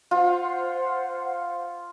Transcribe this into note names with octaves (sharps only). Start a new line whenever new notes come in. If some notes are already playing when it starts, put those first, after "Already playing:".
F4 C5 F#5